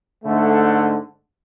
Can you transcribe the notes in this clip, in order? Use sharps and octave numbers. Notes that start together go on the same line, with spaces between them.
G#2 D3 A3